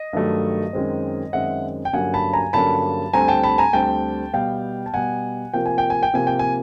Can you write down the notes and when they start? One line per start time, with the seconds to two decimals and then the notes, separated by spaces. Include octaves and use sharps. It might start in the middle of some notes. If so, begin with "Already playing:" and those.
Already playing: D#5
0.13 G2 D#3 F#3 A3
0.73 F#2 D#3 G#3 C4
1.33 F#2 D#3 G#3 C4 E5 F#5
1.85 G5
1.93 G2 D3 F#3 A#3 C#4 F#5 G#5
2.14 A5 B5
2.33 G#5 A#5
2.53 G2 D3 F#3 A#3 C#4 A5 B5
3.13 D2 D3 G3 C4 G#5 A#5
3.28 G5 A5
3.43 A5 B5
3.58 G#5 A#5
3.73 D2 D3 G3 C4 G5 A5
4.34 B2 G3 B3 F5 G5
4.86 A5
4.94 B2 G3 B3 F#5 G#5
5.54 C3 F3 A#3 G5
5.66 G#5
5.78 G5
5.90 G#5
6.03 G5
6.13 C3 F3 A#3 G#5
6.27 G5
6.39 G#5